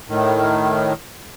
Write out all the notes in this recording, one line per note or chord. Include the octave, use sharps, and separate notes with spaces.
A2 D#3